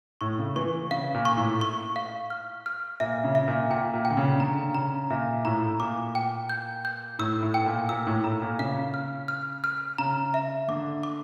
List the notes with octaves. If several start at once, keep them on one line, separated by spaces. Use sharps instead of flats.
A2 C#6
C#3
E3 C#6
C#3 F5
A#2
C#6
A2
C#6
F5
F6
F6
A#2 E5
C#3
E5
A#2
A#2 G5
A#2
G5
D3
C#3
D3 A#5
C#3 A#5
A#2 E5
A2 A#5
A#2 D6
G5
G6
G6
A2 E6
A2
G5
A#2
A#2 E6
A2
A2 A#5
A#2
C#3 F5
F6
F6
F6
C#3 A#5
E5
D3 D6
D6